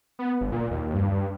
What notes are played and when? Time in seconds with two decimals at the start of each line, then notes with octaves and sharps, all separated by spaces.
0.19 B3
0.41 G1
0.52 A#2
0.71 D#2
0.94 G2